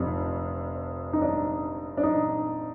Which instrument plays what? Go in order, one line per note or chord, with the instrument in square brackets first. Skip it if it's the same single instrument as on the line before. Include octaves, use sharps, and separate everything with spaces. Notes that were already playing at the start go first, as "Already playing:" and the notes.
Already playing: [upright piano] F1 F2 C3 D4
D#4
D4
D4
D#4